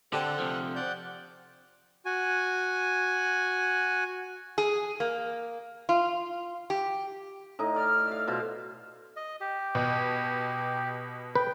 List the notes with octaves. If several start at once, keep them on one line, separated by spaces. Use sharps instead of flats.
D3 C4 D4 G4 A4 F#5
C3 F3
D5 F#5 G6
F#4 G#5
G#4
A#3
F4
G4
A2 D#4 D#5
D5 F6
E5 F5
B2 F4 C5
D#5
G4
B2
B4 G5